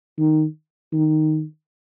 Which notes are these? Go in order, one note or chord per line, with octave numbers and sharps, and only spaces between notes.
D#3
D#3